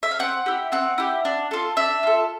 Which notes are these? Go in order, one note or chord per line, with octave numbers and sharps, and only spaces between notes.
E5
F5
C4 F#5
E4 G4
C4 F#5
E4 G4
D4
F4 A4
D4 E5
F4 A4